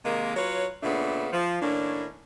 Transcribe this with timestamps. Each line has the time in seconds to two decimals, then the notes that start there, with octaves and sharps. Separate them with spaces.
0.05 C3 D#3 G#3 A#3
0.36 F#3 F4 B4 C#5
0.83 A#2 C#3 A3 B3 D4
1.33 F3
1.62 A2 D#3 A#3 C#4 D4